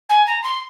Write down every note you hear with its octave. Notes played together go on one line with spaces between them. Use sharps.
G#5
A#5
C6